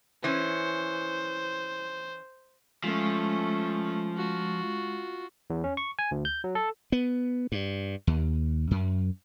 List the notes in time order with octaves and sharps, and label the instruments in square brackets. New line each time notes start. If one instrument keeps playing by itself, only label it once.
[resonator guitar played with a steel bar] E3 C#4 [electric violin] C5
[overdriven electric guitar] F3 [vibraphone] G#3 [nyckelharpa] A3 C#4
[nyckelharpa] F4 F#4
[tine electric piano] E2
C#4
C#6
G#5
D2
G6
F#3
A4
[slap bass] B3
G2
D#2
F#2